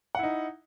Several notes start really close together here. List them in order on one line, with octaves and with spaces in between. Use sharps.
F#5 E4 D#4